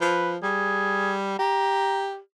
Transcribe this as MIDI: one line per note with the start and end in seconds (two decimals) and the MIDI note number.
0.01 0.37 53
0.01 0.31 71
0.43 1.34 55
0.43 1.12 68
1.39 2.18 67
1.39 2.07 82